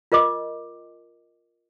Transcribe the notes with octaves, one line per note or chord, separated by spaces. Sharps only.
F4 A#4 D#5 D6